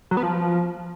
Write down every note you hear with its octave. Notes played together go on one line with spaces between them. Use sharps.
F#3
B3
F3